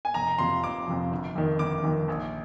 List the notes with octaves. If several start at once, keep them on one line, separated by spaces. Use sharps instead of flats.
G#5
F1 A#5
F2 C3 F3 C6
F1 D6
F2 C3 F3
G1
F2 D#3
G1 D6
F2 D#3
A#1